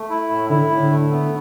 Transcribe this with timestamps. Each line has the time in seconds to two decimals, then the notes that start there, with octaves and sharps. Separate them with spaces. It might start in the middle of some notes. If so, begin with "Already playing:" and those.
Already playing: A3
0.10 E4
0.30 A2
0.50 D3 E4
0.70 A2
0.80 D3
0.91 A3
1.11 B3